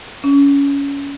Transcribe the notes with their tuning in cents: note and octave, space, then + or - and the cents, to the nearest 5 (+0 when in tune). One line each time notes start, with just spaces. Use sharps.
C#4 +20